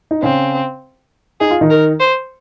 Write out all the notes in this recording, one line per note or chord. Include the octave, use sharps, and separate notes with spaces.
D#4
C#3 C4 C#4
D#4 G#4
F4
D#3 D#4
A#4
C5